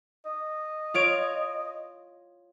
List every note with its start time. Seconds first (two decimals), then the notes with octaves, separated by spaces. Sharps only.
0.26 D#5
0.94 F4 C#5 D7